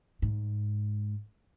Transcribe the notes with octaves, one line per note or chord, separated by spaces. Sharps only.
G#2